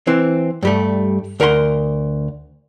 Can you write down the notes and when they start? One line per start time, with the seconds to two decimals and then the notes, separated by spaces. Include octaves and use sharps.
0.07 E3 C4
0.63 G2 G3 A3
1.40 D2 A#4 F#5 A#5 C6